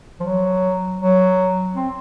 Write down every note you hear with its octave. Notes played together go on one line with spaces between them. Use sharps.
F3
F#3
F#3
C4